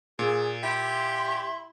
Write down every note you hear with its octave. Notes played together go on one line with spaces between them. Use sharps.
A#2 G#4
E4 G4 C6